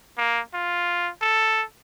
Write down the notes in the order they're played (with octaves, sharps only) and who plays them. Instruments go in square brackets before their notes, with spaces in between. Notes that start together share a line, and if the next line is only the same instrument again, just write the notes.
[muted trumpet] A#3
F4
A4